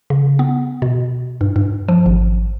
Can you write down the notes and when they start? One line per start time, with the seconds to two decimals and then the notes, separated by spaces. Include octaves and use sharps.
0.10 C#3
0.39 B3
0.82 B2
1.41 G2
1.56 G2
1.88 F3
2.06 G#1